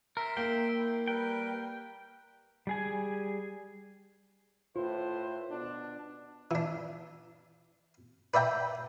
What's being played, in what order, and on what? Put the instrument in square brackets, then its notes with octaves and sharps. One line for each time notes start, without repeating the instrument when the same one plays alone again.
[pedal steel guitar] A#4 [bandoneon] E5 C6
[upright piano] A#3 [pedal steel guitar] G5
[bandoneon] E4
[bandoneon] G3 A#4 B4 [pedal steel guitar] G5
[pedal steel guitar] G3 G#4 G#5
[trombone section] A2 B4 C5 [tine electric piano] F4
[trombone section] B2 D4
[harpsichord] E3 D4
B4 D5 E5 G5 A#5